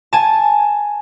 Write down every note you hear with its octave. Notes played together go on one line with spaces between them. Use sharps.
G#5 A5